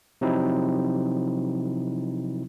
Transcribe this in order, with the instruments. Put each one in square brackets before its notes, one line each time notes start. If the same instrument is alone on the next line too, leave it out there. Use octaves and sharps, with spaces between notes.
[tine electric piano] C3 F3 F#3 C4 D#4 E4